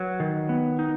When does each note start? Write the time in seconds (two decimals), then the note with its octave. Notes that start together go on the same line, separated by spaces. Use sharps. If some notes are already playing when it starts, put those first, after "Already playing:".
Already playing: F#3 B4
0.20 D#3
0.49 B3
0.79 D#4